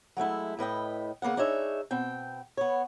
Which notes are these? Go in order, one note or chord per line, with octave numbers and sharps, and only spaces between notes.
F#3 G#3 A3 E4
A2 B4 D#5 G5
C#3 A#3 B3 F#5
D4 D#4 G#4 C#5 E5
B2 C4 G5
B3 C#5